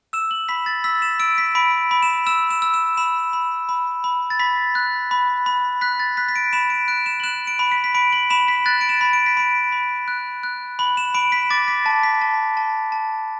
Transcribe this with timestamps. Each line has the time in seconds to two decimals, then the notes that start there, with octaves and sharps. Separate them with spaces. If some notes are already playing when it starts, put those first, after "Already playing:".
0.13 E6 E7
0.31 F#7
0.49 B5 B6
0.66 A6
0.84 E6 B6
1.02 E7
1.20 E6 D7
1.38 B6
1.55 B5 D7
1.91 B5
2.03 E7
2.27 E6 E7
2.51 E7
2.62 E6
2.74 E7
2.97 B5 E7
3.33 B5
3.69 B5
4.04 B5
4.30 A6
4.39 B5 B6
4.75 F#6
5.11 B5
5.46 B5
5.81 F#6 B6
6.00 A6
6.17 F#6 B6
6.28 B6
6.36 D7
6.53 B5 E7
6.70 D7
6.88 F#6 D7
7.06 E7
7.20 F#7
7.24 F#6 E7
7.47 D7
7.59 B5
7.72 B6
7.84 B6
7.95 B5 D7
8.13 F#7
8.30 B5 E7
8.48 B6
8.66 F#6 A6
8.81 D7
8.89 E7
9.01 B5
9.13 D7
9.26 B6
9.37 B5 D7
9.72 B5
10.08 F#6
10.43 F#6
10.79 B5 F#7
10.97 E7
11.15 B5 D7
11.32 B6
11.50 D6 A6
11.68 B6
11.86 A5
12.03 B6
12.21 A5
12.57 A5
12.92 A5